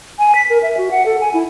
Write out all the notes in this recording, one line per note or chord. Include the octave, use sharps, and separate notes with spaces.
G#5
B6
A#4
E5
F#4
F#5
A4
G#5
E4